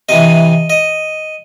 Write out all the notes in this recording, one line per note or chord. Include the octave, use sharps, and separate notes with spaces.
C3 E3 D#5
D#5